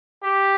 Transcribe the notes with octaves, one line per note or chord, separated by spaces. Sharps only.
G4